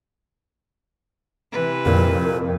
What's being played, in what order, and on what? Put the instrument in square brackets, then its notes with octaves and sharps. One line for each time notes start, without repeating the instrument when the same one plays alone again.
[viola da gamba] C3 E3 B4
[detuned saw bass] F2 [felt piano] A#2 [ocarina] A#4